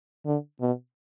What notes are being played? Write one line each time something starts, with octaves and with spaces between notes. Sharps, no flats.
D3
B2